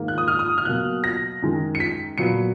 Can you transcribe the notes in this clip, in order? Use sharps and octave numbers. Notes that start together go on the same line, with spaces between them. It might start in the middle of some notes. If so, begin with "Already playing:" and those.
Already playing: G#2 D#3 A#3
F#6
D#6
F6
D#6
F6
B2 F#3 A#3 F#6
A#6
F#2 D#3 G#3
C#7
B6
A#2 F#3 B3 C#7